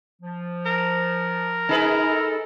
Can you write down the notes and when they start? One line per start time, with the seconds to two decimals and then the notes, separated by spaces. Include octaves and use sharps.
0.22 F3
0.66 A#4
1.69 D#4 G#4 B4
2.09 A4